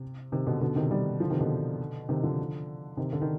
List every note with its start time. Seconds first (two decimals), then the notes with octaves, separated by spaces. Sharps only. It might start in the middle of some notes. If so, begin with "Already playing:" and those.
Already playing: C3
0.32 C3 D#3
0.47 B2 D3
0.61 B2 D3
0.76 C3 D#3
0.91 D#3 G3
1.20 D3 F3
1.30 C3 D#3
1.41 B2 D3
2.09 C3 D#3
2.23 D3 F3
2.97 C3 D#3
3.13 D3
3.22 D#3